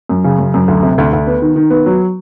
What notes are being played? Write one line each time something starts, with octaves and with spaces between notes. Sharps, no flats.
F#2
C#3
F#2
F#2
D2
C3
D2
D2
B3
D#3
D#3
B3
F#3